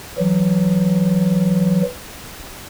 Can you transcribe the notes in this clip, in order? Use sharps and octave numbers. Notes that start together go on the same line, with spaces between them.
E3 F#3